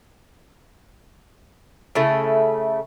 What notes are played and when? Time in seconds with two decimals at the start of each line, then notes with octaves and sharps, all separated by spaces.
1.95 C#3 A3 E4